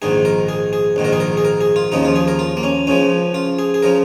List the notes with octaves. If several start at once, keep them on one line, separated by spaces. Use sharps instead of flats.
A#1 G#2 D#3 G#4
A#4
G#4
G#4
A#1 G#2 D#3
A#4
G#4
A#4
G#4
A#4
G#4
F4
D#2 C#3 F3 D#4
F4
G#4
A#4
F4
A#3
C#4
C#2 C#3 F3 C#4
F4
G#4
G#4
C#3 F3 A#4